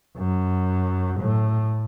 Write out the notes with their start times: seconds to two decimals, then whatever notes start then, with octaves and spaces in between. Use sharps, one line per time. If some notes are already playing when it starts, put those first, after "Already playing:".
0.17 F#2
1.20 A2